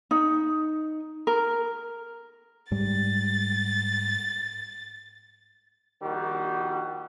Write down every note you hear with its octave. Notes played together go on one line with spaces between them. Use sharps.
D#4
A#4
G#2 G3 A6
A#1 D#3 G3 F#4